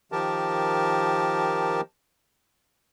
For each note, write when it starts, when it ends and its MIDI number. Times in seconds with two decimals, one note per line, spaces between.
0.12 1.81 51
0.12 1.81 53
0.12 1.81 67
0.12 1.81 70
0.12 1.81 81